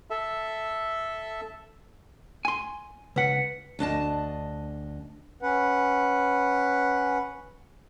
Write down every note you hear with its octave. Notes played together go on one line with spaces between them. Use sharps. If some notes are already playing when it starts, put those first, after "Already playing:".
A4 E5
G#5 C6
C#2 B4 F#5 B6 C#7
D2 D4 D#5 A5
C#4 B4 F#5